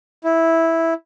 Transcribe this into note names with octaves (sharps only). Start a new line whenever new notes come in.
E4